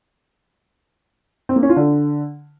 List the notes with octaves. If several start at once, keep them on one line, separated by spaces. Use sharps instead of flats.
C4
A#3
C#4
F4
D3